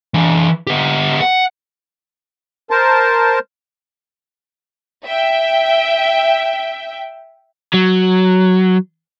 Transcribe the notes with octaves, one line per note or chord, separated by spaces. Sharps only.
E3 D4
B3 G4
F#5
A#4 C5 A5
E5 G5
F#3